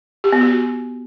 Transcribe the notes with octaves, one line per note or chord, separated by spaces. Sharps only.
G4
B3
F#4